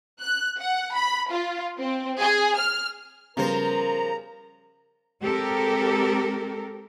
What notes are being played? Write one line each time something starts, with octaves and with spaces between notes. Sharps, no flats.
F#6
F#5
B5
F4
C4
G#4
F6
C#3 F3 G3 B3 A#4 C5 A#5
G#3 C4 G4 A4 A#4